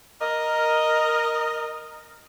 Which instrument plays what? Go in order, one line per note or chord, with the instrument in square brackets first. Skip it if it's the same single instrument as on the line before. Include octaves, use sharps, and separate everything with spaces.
[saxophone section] A#4 D#5